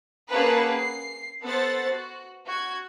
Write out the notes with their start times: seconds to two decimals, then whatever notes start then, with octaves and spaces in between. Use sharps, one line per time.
0.28 A#3 C#4 G#4 B4 F#5 A5
0.77 C7
1.42 B3 A4 C5 F#5 A6
1.89 F#4
2.45 F#4 G#6